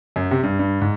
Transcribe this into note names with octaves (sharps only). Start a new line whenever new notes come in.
F#2
C3
G2
G2
G#2